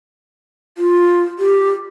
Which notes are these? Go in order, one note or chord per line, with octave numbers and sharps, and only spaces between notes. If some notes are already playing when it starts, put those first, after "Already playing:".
F4
G4